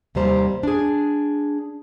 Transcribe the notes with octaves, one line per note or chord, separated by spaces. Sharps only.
D#2 C3 D#3 G3 C5 A#5
D4 G#4